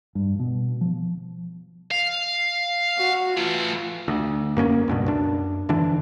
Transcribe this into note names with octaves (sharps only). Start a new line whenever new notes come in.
G2
B2
F3
F5
F#4
E3 A3 F4
D2
F#2 A#3 B3 C#4
C#2 G2 B2
F#2 D4
F2 D3 E3 D4